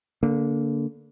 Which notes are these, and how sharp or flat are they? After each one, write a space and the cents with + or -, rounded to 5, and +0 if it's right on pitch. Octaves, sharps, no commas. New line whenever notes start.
D3 -20 A#3 +0